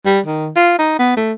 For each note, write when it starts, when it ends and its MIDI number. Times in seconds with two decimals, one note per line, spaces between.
0.06 0.20 55
0.26 0.49 51
0.56 0.75 65
0.79 0.99 63
0.99 1.16 59
1.17 1.33 57